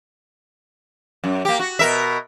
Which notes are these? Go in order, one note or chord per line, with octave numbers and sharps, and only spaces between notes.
F#2
A#3 G4
F#4
B2 A#4 E5